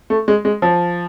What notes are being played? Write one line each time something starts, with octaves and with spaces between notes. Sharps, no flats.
A3
G#3
G#3
F3